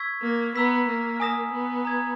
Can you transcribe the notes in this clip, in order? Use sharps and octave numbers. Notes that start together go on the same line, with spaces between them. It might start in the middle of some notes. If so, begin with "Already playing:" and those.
Already playing: C#6 E6 G#6 B6
A#3
B3 A#5 E6 B6
A#3
G#5 D#6 A#6 E7
B3
A#5 D#6 G#6